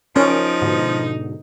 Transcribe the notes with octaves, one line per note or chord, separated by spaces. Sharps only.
F3 C#4 D#4 A#4 D7
G#2 B2 D3